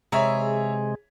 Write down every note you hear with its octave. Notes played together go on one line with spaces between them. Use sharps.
C3 E3 G#3 G#4 C#5 E5 A#5